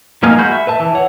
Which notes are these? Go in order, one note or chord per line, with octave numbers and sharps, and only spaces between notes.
F3 A#3 D#4 F5 G#5
G#3 F#4 B5 G6
E5
B4 E5 A5
E3
C#5 F#5